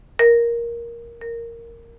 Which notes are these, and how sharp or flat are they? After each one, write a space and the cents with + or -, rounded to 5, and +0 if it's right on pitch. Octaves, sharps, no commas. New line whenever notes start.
A#4 +10
A#4 -5